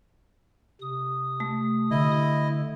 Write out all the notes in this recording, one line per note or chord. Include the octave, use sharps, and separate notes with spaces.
C3 D#6
A3
D3 E4 D#5